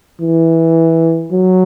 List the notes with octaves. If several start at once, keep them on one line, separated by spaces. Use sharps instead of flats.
E3
F#3